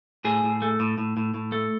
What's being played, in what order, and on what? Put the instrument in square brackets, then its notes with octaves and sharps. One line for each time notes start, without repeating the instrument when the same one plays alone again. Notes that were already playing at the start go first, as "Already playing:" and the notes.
[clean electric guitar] A2 G#4
A2
A3
A2
A2
A2
A2
A3